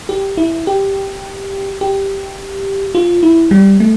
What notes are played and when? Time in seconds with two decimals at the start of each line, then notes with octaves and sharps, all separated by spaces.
0.09 G4
0.37 E4
0.67 G4
1.81 G4
2.95 F4
3.23 E4
3.51 G3
3.80 A3